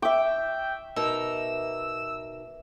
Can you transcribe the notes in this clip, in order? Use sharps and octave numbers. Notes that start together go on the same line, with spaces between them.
E5 G5 D6
B2 D#4 A#4 E6